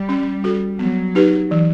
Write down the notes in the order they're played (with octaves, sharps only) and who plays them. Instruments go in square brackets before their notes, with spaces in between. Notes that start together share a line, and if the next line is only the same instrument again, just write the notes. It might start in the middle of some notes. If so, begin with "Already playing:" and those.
Already playing: [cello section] G3
[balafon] C#4
F#4 A4
[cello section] F#3 [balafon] B3
[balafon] D#4 G4 B4
E3